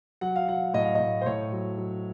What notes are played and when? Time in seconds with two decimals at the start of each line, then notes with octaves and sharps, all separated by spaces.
0.21 F#3 F#5
0.36 F5
0.48 F#3 F#5
0.74 A2 D#5
0.84 F5
0.95 A2 D#5
1.21 C5
1.26 A2 C#5
1.53 F#3
1.78 F#3